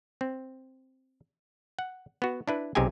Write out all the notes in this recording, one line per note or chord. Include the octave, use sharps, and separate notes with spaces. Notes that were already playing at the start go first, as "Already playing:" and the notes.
C4
F#5
B3 F#4
D4 E4 B4
B1 C3 D#4 G4 G#4 G#5